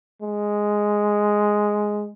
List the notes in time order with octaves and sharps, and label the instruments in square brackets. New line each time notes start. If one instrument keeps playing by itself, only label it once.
[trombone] G#3